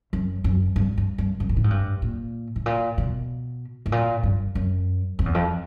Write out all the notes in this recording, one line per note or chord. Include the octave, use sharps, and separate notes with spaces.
F#2
F#2
G2
G2
G2
F#2
A#2
A2
G#2
G2
A#2
A2
A#2
B2
A2
A#2
G2
F#2
F2
E2
F2